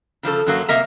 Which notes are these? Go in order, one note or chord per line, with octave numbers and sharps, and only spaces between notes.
C#3 F3 D4 A4
F#2 F#3 A#3
C3 A#3 D#5 E5 A#5